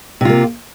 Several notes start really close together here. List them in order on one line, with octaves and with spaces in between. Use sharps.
C3 F4 A#3